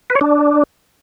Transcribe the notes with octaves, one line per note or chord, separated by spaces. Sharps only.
B4
C#5
D4